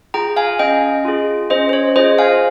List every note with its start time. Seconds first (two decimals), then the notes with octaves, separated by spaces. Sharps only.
0.14 F4 G#4 G5 A#5
0.36 F5 G#5
0.59 C#4 D#5 G5
1.05 F4 G#4
1.50 C#4 C5 D#5
1.69 C5
1.73 C#5
1.96 F4 C5 D#5
1.99 G#4
2.19 F5 G#5